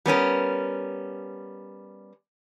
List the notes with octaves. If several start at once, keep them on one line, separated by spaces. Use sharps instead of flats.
G3 B3 C#4 A#4